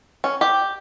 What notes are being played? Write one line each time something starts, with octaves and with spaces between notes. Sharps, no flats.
C#4
G4